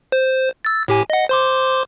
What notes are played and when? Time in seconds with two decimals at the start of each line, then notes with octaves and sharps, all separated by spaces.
0.12 C5
0.65 E6 A6
0.88 A2 G4 G#5
1.10 D#5 F#5
1.29 C5 C6 D6